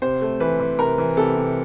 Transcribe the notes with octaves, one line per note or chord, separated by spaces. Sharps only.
C3 C5
A3
E3 B4
E3
C3 A#4
E3
C3 A4
C3